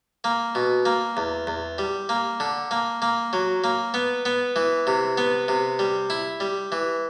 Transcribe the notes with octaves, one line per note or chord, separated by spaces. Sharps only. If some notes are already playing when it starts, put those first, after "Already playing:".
A#3
B2
A#3
E2
E2
G3
A#3
D3
A#3
A#3
F#3
A#3
B3
B3
E3
C3
B3
C3
G3
E4
G3
E3